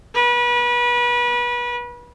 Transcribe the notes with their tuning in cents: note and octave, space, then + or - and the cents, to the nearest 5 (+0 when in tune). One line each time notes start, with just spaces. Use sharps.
B4 -30